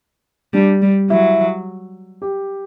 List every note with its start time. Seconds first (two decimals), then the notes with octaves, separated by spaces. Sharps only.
0.53 G3 D4
0.82 G3
1.10 F#3 E4
2.22 G4